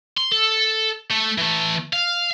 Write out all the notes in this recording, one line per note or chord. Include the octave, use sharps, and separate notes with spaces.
C6
A4
A3
E3 A3
F5